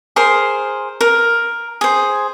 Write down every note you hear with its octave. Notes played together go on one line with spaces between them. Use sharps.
G#4 A#4 C5 C6
A#4
G#4 C5